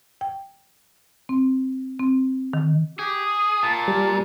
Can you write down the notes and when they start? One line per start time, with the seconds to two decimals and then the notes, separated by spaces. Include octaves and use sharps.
0.21 G5
1.29 C4
1.99 C4
2.53 D#3
2.99 G4 G#4
3.26 D#6
3.63 A#2 A5
3.88 G3